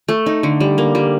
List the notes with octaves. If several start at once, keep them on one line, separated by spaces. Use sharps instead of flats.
A3
D#4
D3
G3
A#3
G3